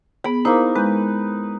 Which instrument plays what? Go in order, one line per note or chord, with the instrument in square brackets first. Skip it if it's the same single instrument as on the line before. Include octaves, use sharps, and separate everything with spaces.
[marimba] B3 G#4 [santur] B5
[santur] A#3 D#4 [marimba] E4 C5
[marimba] G#3 G6 [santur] B4